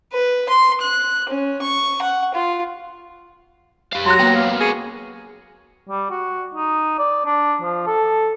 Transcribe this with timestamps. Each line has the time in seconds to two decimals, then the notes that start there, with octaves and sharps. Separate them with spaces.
0.13 B4
0.49 C6
0.81 F#6
1.29 C#4
1.62 C#6
2.02 F#5
2.34 F4
3.93 G4 F5
4.06 F#3 A#5 C6 F#6
4.19 A#3 B3 G5
4.35 F5
4.60 G#4 C#5
5.89 G3
6.11 F#4
6.55 D#4
6.98 D5
7.26 D4
7.62 F3
7.87 A4